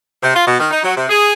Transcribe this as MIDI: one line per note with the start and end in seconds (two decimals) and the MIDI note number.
0.22 0.30 48
0.34 0.45 65
0.46 0.57 47
0.58 0.66 51
0.70 0.79 63
0.82 0.92 54
0.95 1.05 48
1.09 1.32 68